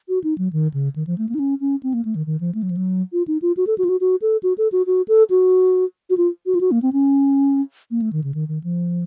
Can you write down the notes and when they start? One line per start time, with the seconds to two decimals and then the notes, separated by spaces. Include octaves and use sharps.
0.08 F#4
0.24 D#4
0.38 F#3
0.53 D#3
0.74 C#3
0.96 D#3
1.07 F3
1.18 A3
1.29 A#3
1.35 D#4
1.39 C#4
1.61 C#4
1.83 C4
1.94 A#3
2.05 A3
2.15 D#3
2.26 D#3
2.40 F3
2.55 A3
2.63 F#3
2.70 F3
2.77 F#3
3.13 F4
3.28 D#4
3.42 F4
3.57 F#4
3.67 A4
3.78 F#4
3.84 F4
3.89 F#4
4.01 F#4
4.22 A4
4.43 F#4
4.58 A4
4.72 F#4
4.87 F#4
5.08 A4
5.30 F#4
6.10 F#4
6.17 F4
6.46 F#4
6.55 F4
6.61 F#4
6.71 A#3
6.82 C4
6.93 C#4
7.91 A#3
8.02 A3
8.13 D#3
8.24 C#3
8.34 D#3
8.48 D#3
8.64 F3